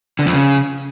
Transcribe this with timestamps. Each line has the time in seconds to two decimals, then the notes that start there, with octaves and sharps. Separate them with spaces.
0.19 D3
0.26 F2
0.33 C#3